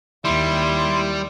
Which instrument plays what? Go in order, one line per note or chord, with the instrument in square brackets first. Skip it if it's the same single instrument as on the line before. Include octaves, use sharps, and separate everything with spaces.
[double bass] D#2 [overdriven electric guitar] G3 [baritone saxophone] E4 [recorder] C6